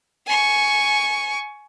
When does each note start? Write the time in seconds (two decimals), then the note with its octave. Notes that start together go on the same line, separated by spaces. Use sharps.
0.26 G#5 C#6